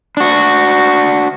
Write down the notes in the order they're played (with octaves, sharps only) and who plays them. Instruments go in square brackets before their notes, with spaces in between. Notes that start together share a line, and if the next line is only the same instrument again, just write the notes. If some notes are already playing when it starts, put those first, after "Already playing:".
[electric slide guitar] D4 F#4